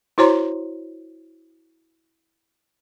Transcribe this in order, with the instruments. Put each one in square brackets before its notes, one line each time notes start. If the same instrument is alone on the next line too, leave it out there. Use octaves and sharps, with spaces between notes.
[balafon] E4 F#4 C5 C#5 A#5 C6